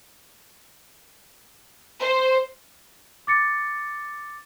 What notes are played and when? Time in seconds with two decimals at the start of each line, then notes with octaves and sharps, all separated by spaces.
2.00 C5
3.27 D6 A6 C#7